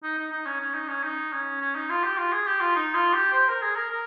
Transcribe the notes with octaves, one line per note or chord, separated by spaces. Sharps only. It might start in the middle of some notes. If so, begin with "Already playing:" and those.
D#4
D#4
D#4
C#4
C#4
D#4
C#4
D#4
C#4
C#4
D#4
F4
G4
F4
G#4
G4
F4
D#4
F4
G4
C5
A#4
G#4
A#4
A#4